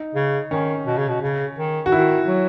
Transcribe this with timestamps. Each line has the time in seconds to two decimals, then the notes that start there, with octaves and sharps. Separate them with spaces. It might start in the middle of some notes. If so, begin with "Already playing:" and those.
Already playing: D#4
0.15 C#3
0.51 D#3 C#4
0.87 B2
0.98 C#3
1.09 B2
1.22 C#3
1.56 D#3
1.86 F#4
1.92 D#3 E4
2.27 F#3